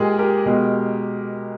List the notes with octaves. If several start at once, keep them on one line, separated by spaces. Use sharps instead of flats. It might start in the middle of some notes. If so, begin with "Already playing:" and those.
Already playing: A#2 G#3 G4 G#4 A#4
G4 A#4
B2 G#3